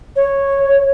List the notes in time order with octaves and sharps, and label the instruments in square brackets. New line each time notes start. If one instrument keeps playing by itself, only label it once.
[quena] C#5